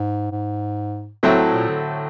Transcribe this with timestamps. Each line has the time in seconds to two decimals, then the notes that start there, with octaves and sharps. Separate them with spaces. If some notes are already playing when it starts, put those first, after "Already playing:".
Already playing: G#2
0.31 G#2
1.23 A2 F#3 A3 C4 E4
1.53 A#2
1.68 D3